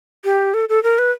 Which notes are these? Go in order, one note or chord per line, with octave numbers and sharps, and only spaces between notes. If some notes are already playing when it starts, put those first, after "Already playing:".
G4
A4
A4
A#4
B4